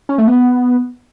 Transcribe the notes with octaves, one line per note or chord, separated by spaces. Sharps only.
C#4
A3
B3